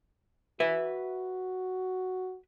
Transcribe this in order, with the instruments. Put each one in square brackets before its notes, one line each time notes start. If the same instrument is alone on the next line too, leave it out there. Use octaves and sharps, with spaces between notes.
[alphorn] F#4 [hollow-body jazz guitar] B4 E5